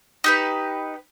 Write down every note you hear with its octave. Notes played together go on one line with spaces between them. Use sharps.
D#4 G4 B4